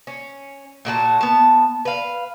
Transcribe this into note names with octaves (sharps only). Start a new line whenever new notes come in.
C#4
A#2 F#4 A4 A5
B3 A5
B4 F5